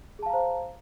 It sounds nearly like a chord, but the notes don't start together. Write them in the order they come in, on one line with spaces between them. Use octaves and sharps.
G#4 A5 F5 A#5 C5